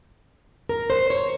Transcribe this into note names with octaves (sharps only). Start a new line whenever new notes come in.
A#4
C5
C#5